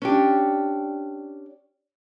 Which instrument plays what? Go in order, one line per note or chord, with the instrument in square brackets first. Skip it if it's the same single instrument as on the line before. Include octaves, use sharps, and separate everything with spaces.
[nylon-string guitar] C#4 D4 G4